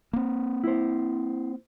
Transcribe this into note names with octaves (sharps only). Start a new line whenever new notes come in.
A#3 C4
E4 C5